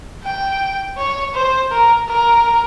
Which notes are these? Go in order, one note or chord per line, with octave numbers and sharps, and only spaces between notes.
G5
C#5
C5
A#4
A#4